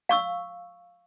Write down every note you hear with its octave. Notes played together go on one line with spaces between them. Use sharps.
F5 C#6 E6